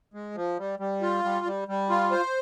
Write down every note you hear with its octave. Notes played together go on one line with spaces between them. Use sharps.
G#3
F3
G3
G3
F4
G3
G3
G3
F4
C5